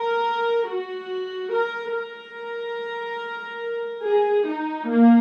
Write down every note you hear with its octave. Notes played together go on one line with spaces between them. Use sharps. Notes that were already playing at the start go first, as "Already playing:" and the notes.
Already playing: A#4
F#4
A#4
A#4
G#4
D#4
A#3